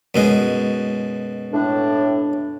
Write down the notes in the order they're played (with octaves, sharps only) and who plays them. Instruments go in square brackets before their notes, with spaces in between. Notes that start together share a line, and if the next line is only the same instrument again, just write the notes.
[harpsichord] F#2 B2 G#3
[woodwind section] A2 D4